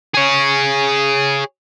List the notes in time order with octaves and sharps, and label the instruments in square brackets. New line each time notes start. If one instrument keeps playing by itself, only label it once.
[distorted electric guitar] G#4 C#5